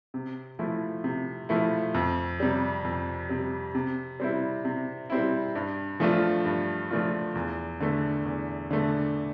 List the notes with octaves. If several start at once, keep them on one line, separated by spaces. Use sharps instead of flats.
C3
F3 A3 E4
C3
F3 A3 E4
F2
C3 G3
F2
C3 G3
C3
G3 C4 E4
C3
G3 C4 E4
G2
F3 A3 D4 F4
G2
F3 A3 D4 F4
E2
D3 A3
E2
D3 A3